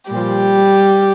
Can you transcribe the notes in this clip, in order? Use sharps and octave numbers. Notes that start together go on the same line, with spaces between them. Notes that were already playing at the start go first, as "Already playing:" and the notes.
A#2 F3 G3 G4